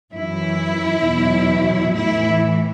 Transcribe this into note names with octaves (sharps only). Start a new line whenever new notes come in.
F#2 E3 E4
E2 B2 F#3
A2 E3 E4